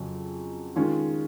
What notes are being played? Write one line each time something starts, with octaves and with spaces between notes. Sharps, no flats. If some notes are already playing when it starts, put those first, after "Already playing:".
Already playing: F2 C#3 F#3 C#4
D#3 G#3 C#4 F4